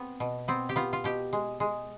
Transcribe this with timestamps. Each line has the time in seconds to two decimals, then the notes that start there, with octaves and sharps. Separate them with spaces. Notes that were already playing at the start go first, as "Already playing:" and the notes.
Already playing: B3 C4
0.20 B2
0.48 B3 C4
0.69 G4
0.76 B3 F4
0.93 F4
1.04 B2 G4
1.33 G#3
1.60 G#3